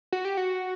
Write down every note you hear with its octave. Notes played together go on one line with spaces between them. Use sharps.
F#4
G4
F#4